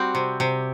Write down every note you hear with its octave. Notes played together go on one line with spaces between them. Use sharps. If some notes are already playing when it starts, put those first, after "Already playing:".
Already playing: G3 C4 F#4
C3
C3